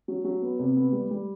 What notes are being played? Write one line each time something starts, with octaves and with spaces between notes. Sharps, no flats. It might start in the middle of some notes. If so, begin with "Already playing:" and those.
F#3
F#3
B3
C3
B3
G3
G3